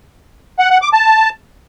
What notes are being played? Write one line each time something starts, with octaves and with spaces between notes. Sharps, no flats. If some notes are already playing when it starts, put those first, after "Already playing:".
F#5
F#5
D6
A5